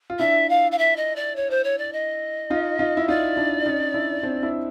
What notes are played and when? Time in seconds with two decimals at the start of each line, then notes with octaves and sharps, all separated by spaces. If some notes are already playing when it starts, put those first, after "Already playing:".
0.10 F4
0.19 D4 E4 E5
0.49 F5
0.71 F5
0.78 E5
0.96 D#5
1.16 D5
1.36 C#5
1.50 C5
1.64 C#5
1.78 D5
1.93 D#5
2.50 D#4 F4
2.79 D#4 F4
2.97 E4
3.08 D#4 F4 D5
3.37 D4 E4
3.66 C#4 D#4
3.94 D4 E4
4.23 C4 D4
4.43 D4 E4